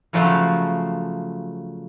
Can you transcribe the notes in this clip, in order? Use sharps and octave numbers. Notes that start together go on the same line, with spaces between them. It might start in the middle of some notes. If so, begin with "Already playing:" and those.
C#3 F3 F#3 A3